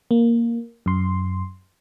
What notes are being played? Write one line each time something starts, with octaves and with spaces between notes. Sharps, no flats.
A#3
F#2 C6